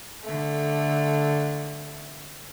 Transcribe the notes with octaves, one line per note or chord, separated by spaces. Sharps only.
D3 A3